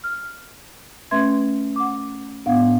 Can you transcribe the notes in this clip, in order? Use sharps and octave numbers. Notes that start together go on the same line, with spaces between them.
F6
A3 C#4 B4 E5 C6 G#6
F#5 D6
A2 B3 D4 F5 F#5